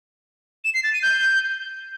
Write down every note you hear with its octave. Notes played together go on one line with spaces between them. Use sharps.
E7
C7
A6
D#7
G6